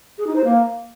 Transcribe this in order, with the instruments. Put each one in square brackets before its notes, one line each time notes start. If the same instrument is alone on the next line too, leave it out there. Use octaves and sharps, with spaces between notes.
[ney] G#4
D#4
C5
A#3